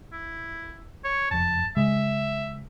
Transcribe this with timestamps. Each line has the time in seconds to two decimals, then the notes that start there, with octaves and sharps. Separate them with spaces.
0.13 E4
1.04 C#5
1.31 F#1 F2 A5
1.77 C#3 G#3 E5